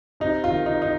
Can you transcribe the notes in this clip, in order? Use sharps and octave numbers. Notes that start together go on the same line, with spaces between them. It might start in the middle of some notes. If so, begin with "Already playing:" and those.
C3 D#4
F4
D#3
D#4
D#4